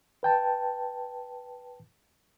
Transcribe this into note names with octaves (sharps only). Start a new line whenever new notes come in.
B4 G5 A5